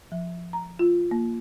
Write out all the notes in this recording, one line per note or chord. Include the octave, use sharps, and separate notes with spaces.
F3
A#5
F4
A#3